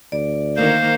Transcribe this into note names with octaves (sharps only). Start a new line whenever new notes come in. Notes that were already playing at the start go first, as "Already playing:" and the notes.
D2 D5
D#3 A#3 C5 F5